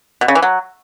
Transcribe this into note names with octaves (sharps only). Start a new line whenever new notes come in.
B2
C#3
E3
F#3